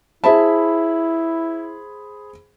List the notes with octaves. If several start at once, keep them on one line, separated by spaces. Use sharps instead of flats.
E4 G#4 C5 E5 A5 B5